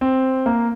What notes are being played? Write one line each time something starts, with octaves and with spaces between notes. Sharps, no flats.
C4
A#3